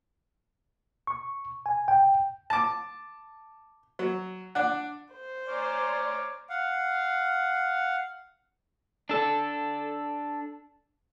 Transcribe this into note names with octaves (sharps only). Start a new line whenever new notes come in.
C#6
G#5
G5
A5 D6
F#3
D4 F#5
C5
C#5 D5 G#5 A#5 C6 D6 F6
F5 F#5
D4 A4